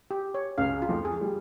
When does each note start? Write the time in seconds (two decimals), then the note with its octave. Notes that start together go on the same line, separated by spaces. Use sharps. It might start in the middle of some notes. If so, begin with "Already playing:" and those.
0.11 G4
0.34 C#5
0.58 C#2 C#3 F5
0.82 F4
0.89 F2 F3
1.05 G#4
1.21 G3